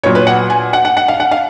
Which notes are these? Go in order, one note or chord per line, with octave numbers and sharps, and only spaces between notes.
A#2 F#3 B3 C#5
B4
F#5
G#5
F#5
F#5
F#5
F5
F#5
F5